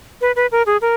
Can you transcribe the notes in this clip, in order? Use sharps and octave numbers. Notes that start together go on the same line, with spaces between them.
B4
B4
A#4
G#4
A#4